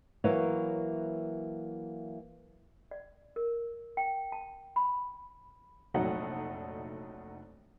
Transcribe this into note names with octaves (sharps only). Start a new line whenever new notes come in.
E3 F#3 A#3 C#5
D5
A#4
G5
A5
B5
F1 A#1 F#3 A3 D#4 F#5